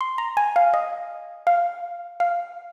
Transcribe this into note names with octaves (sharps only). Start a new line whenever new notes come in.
C6
A#5
G#5
F5
D#5
F5
F5